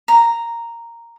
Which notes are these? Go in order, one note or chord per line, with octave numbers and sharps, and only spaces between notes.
A#5